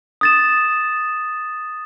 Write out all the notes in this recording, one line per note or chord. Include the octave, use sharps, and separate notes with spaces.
D#6 A6 E7